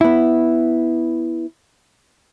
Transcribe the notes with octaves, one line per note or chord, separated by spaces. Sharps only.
B3 E4